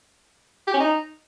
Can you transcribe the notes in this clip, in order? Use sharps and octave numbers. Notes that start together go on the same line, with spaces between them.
G4
C#4
D#4